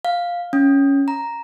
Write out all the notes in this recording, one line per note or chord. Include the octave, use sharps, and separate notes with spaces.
F5
C#4
A#5